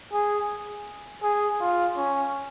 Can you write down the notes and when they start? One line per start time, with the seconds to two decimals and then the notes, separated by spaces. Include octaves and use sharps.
0.13 G#4
1.23 G#4
1.61 F4
1.97 C#4